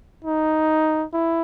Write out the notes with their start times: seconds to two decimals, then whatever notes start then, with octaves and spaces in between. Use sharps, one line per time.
0.24 D#4
1.13 E4